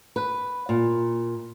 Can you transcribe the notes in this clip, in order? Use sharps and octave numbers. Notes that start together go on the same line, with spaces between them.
B4
A#2